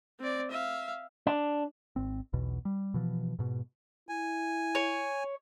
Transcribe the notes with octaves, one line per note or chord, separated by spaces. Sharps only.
C4 D5
E5 F5
D4
G#1 C4
B1 E2 B2
G3
B2 E3 F3
G#2 B2
E4 G#5
C#5